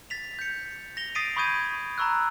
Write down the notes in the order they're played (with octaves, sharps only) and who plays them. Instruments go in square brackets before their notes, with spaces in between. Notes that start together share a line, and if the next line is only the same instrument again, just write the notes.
[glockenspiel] A6 B6 F7
G6 C#7
A#6 F7 G7
D#6 A6 B6 C7 D7 D#7
B5 C#6 D#6 G6 G#6 D#7
A#5 B5 C#6 E6 F#6